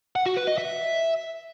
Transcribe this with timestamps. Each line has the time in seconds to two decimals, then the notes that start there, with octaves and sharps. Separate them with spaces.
0.16 F#5
0.26 F#4
0.37 B4
0.48 D#5
0.58 E5